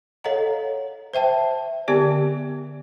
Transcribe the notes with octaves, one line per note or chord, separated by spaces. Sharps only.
A4 C#5 D#5 F5 F#5 A#5
C5 E5 G5 A5
D3 B3 G4 D5 G#5